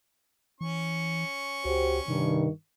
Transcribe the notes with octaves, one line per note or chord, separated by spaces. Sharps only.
E3 C#4 C#6
C#2 F#4 G4 C5
G2 C3 D#3